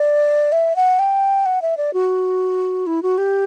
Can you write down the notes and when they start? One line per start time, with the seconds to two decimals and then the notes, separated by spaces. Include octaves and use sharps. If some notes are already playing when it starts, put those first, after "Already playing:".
Already playing: D5
0.52 E5
0.76 F#5
0.99 G5
1.46 F#5
1.62 E5
1.77 D5
1.93 F#4
2.87 E4
3.03 F#4
3.18 G4